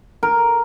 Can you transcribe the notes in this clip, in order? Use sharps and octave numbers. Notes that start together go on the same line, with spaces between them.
A#4